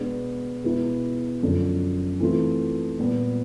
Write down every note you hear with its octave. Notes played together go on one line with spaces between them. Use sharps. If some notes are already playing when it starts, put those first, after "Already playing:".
Already playing: B2 G#3 B3 D4
B2 G#3 B3 E4
F#2 D3 F3
E3 A3 C4 F4
A#2 G3 B3